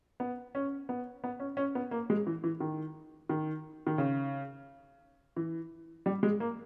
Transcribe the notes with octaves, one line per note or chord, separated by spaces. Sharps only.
B3
C#4
B3
B3
C#4
C#4
B3
A#3
G#3
E3
E3
D#3
D#3
D#3
C#3
E3
G3
G#3
A#3